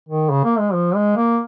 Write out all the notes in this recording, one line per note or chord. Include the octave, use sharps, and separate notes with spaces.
D#3
C#3
A#3
G#3
F3
G#3
A#3